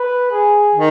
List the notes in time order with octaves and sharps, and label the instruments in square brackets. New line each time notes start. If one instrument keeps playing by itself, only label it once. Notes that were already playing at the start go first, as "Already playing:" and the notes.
Already playing: [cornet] B4
G#4
[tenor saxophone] D#3